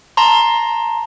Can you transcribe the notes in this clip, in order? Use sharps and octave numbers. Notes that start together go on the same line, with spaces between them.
A5 A#5 C6